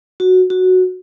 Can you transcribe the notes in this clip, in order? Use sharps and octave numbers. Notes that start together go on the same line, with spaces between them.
F#4
F#4